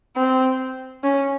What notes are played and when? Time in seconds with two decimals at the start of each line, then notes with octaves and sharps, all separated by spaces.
0.16 C4
1.04 C#4